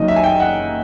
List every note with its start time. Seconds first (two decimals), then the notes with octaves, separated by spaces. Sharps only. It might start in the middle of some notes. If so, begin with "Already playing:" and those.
Already playing: F#1 F#2 D#3 D#5
0.08 E5
0.16 G#5
0.24 G5
0.40 F#5